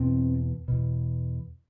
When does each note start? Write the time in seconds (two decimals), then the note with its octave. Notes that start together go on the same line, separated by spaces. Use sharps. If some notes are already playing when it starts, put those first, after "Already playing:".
Already playing: E2 B2 C4
0.68 E2 B2